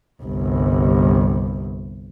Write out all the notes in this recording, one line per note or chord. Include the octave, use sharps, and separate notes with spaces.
G1 C2